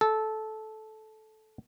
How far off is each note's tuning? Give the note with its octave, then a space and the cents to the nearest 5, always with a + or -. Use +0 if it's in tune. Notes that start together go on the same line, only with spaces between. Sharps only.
A4 -15